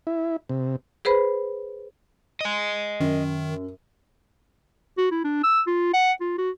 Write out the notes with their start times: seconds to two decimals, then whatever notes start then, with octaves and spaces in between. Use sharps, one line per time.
0.07 E4
0.49 C3
1.05 G#4 B4 C5 B5
2.41 D#5 G#5
3.00 F#2 D#3
4.97 F#4
5.11 E4
5.24 D4
5.44 E6
5.67 F4
5.94 F#5
6.21 F4
6.38 F#4